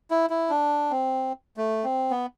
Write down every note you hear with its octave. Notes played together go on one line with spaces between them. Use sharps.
E4
E4
D4
C4
A3
C4
B3